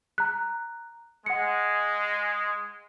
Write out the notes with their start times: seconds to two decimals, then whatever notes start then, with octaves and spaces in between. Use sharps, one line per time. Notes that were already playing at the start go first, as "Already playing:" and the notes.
0.18 A#5 F#6
1.26 G#3 F#5 C#7